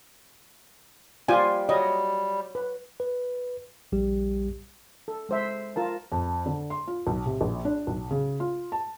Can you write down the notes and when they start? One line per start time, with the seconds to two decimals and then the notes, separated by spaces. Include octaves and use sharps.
1.28 G3 F4 C5 D5 G#5
1.69 F#3 G3 D#5
2.55 B4
3.00 B4
3.92 A#1 G3 G4
5.08 A4
5.29 G#3 C5 E5
5.76 F4 A#4 A5
6.12 F2
6.46 D3
6.70 C6
6.87 F4
7.07 B1
7.26 C3
7.41 A#1
7.65 D4
7.87 B1
8.11 C#3
8.40 F4
8.72 A5